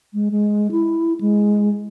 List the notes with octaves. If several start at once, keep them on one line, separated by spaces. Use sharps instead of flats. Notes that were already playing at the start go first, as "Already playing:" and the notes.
G#3
G#3
E4
G#3